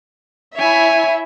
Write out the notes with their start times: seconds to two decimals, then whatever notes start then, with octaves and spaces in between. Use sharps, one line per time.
0.57 E4 C#5 E5 G#5